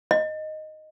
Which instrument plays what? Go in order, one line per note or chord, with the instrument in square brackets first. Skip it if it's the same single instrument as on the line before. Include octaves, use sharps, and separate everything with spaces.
[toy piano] D#5